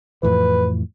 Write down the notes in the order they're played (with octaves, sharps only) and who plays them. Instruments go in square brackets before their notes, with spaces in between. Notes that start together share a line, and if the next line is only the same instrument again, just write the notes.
[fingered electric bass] F2 A2 E3 [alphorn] B4